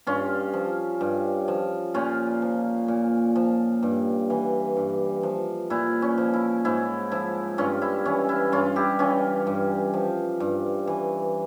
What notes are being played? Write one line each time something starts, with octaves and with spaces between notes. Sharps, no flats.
G2 C#4 F4
F3
G2
F3
A#2 C#4 F4
F3
A#2
F3
G2
E3
G2
F3
A#2 E4
C#4
F3
E4
G#2 E4
F3 E4
G2 C#4 F4
E4
E3 C#4
E4
G2 C#4 F4
E4 G4
E3 C#4 F4
G2
F3
G2
E3